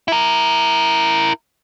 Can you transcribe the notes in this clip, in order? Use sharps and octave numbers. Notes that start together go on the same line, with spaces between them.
E4 A#4